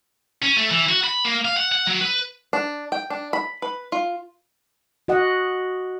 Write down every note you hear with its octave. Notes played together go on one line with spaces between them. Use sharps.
C#4
A3
E3
F#4
B5
A#3
F5
F#5
F#5
F#3
B4
D4
G5
D4
B5
B4
F4
F#4 D#5 F#5